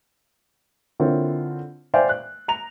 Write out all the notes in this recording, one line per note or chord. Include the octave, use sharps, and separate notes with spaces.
D3 A#3 C4 E4 F4 C#5
C5 D5 E5 F5 G5 G#5
F#6
A#5 F7